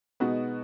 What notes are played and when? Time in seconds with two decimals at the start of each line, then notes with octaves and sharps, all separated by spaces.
0.20 B2 G#3 B3 D#4 F#4